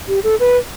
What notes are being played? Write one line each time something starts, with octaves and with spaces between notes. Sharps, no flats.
G4
A4
B4